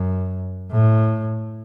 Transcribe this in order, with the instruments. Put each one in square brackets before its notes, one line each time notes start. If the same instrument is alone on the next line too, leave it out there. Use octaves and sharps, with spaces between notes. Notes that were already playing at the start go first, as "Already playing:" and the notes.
Already playing: [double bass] F#2
A2